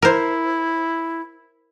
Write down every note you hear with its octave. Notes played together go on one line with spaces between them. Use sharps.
E4 A#4 C5